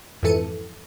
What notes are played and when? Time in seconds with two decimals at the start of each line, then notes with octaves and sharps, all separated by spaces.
0.23 F2 G#2 E3 A4 C#7 D#7